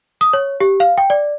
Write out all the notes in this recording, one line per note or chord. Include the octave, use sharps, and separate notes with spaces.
D#6
C#5
G4
F5
G5
D5